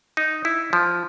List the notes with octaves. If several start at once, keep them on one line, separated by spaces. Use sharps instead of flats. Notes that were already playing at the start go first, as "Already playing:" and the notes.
D#4
E4
F3